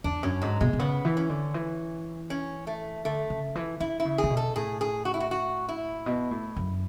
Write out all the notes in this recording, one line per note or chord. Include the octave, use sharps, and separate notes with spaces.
E2 D4
F#2 C#4
G#2 F#3
B2 G#3
B2
C#3 B3
E3
C#4
D3
E3
C#4
A3
D3 A3
C#3
E3
E3 E4
E4
C#3
G#4
C#3
B2
A4
A2 G#4
G#4
F#4
E4
F#4
F#4
E4
B2
A2
F#2